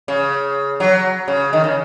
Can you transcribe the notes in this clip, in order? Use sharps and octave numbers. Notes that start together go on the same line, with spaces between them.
C#3
F#3
C#3
D#3
C#3